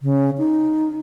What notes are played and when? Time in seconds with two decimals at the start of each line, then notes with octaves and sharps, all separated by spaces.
0.01 C#3
0.38 D#4